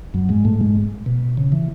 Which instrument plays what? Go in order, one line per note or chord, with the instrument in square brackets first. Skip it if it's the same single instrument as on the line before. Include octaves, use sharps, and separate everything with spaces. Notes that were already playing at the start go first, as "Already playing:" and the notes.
[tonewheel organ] F#2 F#3
G#2 G#3
A2 A3
G#2 G#3
B2
C#3
E3